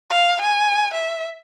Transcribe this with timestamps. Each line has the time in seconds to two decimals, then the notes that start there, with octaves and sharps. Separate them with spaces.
0.10 F5
0.41 G#5
0.94 E5